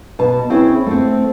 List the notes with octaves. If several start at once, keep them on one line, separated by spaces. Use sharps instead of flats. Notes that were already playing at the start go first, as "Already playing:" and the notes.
B2 A5
C4 C#4 E4 G#4
A3 C4